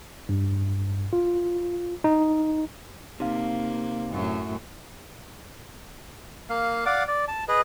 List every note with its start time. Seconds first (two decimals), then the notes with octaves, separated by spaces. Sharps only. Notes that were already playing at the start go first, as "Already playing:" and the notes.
0.29 G2
1.13 F4
2.04 D#4
3.20 C3 A#3 D#4 F5
4.11 F#2 A2 F#3
6.50 A#3 F5
6.86 D5 F5 F#5 D6
7.08 D5
7.28 A5
7.48 G#4 B4 D#5